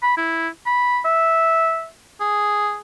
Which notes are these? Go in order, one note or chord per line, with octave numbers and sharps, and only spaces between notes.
B5
E4
B5
E5
G#4